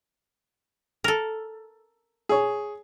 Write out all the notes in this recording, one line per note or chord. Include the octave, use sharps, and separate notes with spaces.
A4 A#4
G#4 C#5